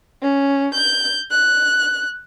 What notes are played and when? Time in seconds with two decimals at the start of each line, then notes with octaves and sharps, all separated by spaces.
0.22 C#4
0.74 G6
1.31 F#6